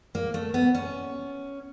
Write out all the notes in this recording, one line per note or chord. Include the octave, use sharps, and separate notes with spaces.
A#3
A3
B3
C#4